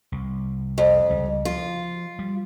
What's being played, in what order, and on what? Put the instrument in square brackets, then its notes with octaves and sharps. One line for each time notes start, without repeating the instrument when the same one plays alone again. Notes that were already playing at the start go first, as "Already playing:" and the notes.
[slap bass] C2
[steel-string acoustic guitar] F2
[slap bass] C#2 G3
[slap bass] F3 [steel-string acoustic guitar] F4
[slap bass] G3